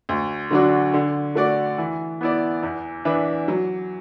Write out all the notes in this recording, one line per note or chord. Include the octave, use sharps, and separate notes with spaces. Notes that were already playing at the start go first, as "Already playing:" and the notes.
D2
D3 F#3 D4 F#4
D3
A3 F#4 D5
E3
B3 E4 D5
E2
E3 D4 B4 E5
F#3